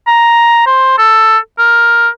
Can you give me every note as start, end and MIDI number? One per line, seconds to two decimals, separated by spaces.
0.07 0.62 82
0.67 0.97 72
0.98 1.38 69
1.58 2.09 70